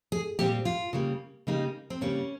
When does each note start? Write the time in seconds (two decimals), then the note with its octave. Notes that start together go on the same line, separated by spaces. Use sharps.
0.12 G#4
0.39 A#2 G3 C4 G4
0.65 F4
0.93 C#3 G3 A#3
1.47 C#3 G3 A#3 D#4
1.90 C4
2.01 C#3 G3 A#3 C#4